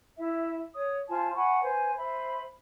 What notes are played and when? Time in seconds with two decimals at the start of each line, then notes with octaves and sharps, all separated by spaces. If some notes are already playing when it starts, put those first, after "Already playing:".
0.17 E4 E5
0.74 C#5 D#6
1.09 F4 C5 G#5 A5
1.35 F#5 G#5 B5 C#6
1.62 B4 C5 G#5
1.96 C5 E5 B5